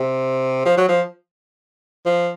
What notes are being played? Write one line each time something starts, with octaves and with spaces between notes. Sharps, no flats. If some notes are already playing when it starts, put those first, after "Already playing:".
Already playing: C3
F3
F#3
F3
F3